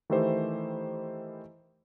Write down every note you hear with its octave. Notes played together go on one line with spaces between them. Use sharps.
D#3 E3 A3 E4 G4 C5